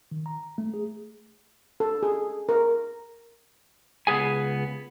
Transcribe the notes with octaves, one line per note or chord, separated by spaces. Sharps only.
D#3
A#5
A3
G#4
A4
G#4
A#4
C#2 B3 G#4 G#5